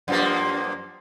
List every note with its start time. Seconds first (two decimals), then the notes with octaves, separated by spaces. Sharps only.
0.08 F#2 F3 A#3